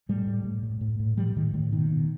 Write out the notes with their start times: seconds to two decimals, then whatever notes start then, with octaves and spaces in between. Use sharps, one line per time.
0.09 A2 G3 A3
0.27 A2
0.45 A2
0.63 A2
0.81 A2
1.00 A2
1.17 A2 F3 G3
1.36 A2 D#3
1.54 A2 D#3
1.72 B2 D#3
1.90 B2